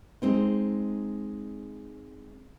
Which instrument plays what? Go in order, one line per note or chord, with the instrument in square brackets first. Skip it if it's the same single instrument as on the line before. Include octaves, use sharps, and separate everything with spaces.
[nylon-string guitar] G#3 C4 D#4